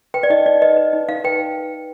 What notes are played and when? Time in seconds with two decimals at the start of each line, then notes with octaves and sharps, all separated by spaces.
0.14 B4 G5
0.23 D5
0.30 D#4 D#5
0.46 D#4 D5
0.61 B4 D#5
0.77 B4
0.93 D#4
1.08 D#4 F5
1.24 B4 G5